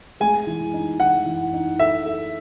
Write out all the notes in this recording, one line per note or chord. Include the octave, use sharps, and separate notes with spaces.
G#3 G#5
E3
D#4
E3 F#5
E3
D#4
A4 E5
A4